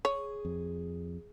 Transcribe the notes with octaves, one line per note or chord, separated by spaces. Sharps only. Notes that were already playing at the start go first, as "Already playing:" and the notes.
G#4 C#5
F2